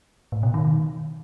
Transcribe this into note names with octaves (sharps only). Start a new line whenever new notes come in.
A2
B2
D#3